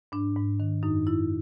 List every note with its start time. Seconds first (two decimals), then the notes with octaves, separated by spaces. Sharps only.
0.12 G#2 D4
0.36 G#2
0.60 D#3
0.83 F#2 D#4
1.07 F#2 E4